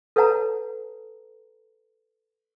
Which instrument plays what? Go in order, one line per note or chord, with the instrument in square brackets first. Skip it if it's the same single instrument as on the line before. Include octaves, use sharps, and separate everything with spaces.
[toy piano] A4 B4 C#5 F#5 A5 A#5